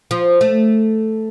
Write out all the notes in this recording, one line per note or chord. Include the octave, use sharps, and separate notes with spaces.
F3
A3